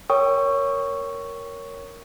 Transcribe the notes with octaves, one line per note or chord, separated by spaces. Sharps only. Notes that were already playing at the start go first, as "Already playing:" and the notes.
A#4 C#5 G5 C#6 D#6